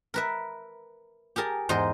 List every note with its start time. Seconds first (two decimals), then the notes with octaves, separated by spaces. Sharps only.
0.14 A#4 B4 E5
1.36 G4 G#4 A#4 A5
1.69 E2 G#2 C5 D#5 C6